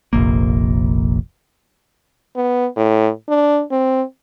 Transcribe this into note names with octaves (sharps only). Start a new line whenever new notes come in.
F1 A#1 A#3
B3
A2
D4
C4